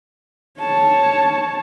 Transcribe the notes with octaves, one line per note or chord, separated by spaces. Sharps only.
C#5 A5